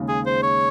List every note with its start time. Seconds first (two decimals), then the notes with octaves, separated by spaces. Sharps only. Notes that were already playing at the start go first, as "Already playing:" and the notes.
Already playing: D#2 C#3 G#3
0.08 G#4
0.26 C5
0.43 C#5